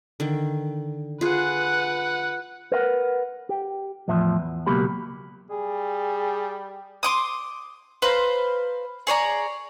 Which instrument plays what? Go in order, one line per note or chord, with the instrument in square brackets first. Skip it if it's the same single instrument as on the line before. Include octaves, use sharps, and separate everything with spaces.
[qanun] D3 D#3
[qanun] F4 G#4 [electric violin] B4 F#5
[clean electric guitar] A#4 B4 F5 F#5
G4
E2 A2 F3 E5
E2
C#2 B2 F#3 A#3 G4 B5
[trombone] G3 [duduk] G#4
[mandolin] C6 D6 D#6
B4 C5 F5 A#5
G#4 C#5 D5 A#5